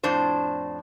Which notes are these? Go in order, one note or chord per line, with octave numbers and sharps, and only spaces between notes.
F2 A2 D4 C5